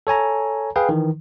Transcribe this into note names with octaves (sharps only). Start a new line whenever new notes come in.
A4 C#5 G#5 A#5
G#4 B4 F5 G5
D#3 E3